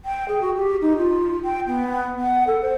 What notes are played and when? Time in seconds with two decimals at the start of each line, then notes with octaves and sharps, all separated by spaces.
0.05 G5
0.28 G#4
0.41 F#4
0.56 G4
0.81 D#4
0.97 F4
1.45 G5
1.67 B3
2.19 F#5
2.47 A4
2.62 C5